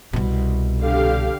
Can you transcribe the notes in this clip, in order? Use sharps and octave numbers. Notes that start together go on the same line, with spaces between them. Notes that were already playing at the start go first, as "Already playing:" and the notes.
C2 B2
D3 G4 F5